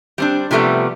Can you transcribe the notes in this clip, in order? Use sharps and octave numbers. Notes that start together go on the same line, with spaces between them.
G3 C4 D4
C3 F3 G3 A3 B3